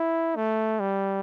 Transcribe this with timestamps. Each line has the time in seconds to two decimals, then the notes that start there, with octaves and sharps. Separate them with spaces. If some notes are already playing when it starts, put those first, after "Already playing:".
Already playing: E4
0.36 A3
0.80 G3